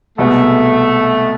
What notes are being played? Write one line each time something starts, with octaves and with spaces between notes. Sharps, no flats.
C2 B2 G#3 A3 B3